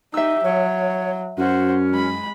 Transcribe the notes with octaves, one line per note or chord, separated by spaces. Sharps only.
D#4 G4 E5 E6
F#3 C#5
F#2 C#4 F#4 C5
G#3 B5